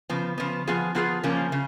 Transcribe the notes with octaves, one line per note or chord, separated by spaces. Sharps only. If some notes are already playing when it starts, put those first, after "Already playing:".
C#3 F3 B3
C#3 F3 B3
F3 B3 F4 G#4
F3 B3 F4 G#4
C#3 F3 A#3 C#4
C#3